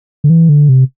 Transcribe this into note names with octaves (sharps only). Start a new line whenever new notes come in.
D3
E3
D3
C3